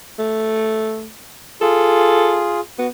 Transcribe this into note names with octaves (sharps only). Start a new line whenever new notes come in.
A3
F4 G#4 A4
B3 F#4